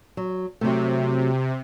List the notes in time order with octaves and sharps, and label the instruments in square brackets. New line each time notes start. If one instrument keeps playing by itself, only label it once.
[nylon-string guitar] F#3
[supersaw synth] C3 [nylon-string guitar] F#3 A3